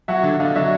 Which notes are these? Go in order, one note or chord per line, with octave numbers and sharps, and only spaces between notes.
F#3 E5 F#5
D3
D3 D#5 F5
F#3 D5 E5